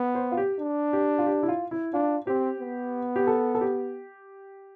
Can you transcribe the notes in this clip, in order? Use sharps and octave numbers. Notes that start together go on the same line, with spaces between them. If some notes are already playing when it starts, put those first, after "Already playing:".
Already playing: B3
C5
F4
G4
D4
G4
F4
G4
E4
F4
E4
D4 F4
C4 G4
B3
G4
A4
A4
G4